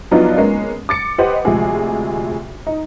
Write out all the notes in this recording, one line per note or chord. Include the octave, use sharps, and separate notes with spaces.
F3 F#3 B3 D4 D#4 F4
G#3 A#3 B3 C#4
D6 A6 C#7
G4 B4 C5 D#5 F#5
D2 C3 F3 G#3 G#4
D#4